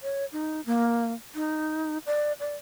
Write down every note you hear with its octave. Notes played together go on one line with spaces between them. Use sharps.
C#5
D#4
A#3
D#4
D5
D5